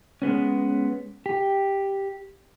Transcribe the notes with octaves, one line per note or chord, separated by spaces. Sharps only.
G#3 B3 C#4
G4